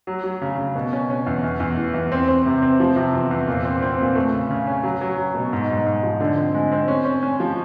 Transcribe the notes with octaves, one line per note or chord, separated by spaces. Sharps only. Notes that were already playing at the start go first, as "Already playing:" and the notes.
F#3
F#3
C#3
C#3
B2
C#4
C#4
E2
E2
E2
E3
E2
C4
C4
C3
C4
F3
C3
E2
E2
A#2
C4
C4
A#2
A3
C#3
C#3
C#4
F#3
F#3
F#3
B2
G#2
G#2
G#2
F3
D3
C4
G#3
C4
C#4
C#4
C#4
F3